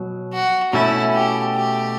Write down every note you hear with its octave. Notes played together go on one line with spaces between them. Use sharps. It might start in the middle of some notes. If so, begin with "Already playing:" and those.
Already playing: B2 F#3
F#4
B2 A3 C#4 E4
G4
G4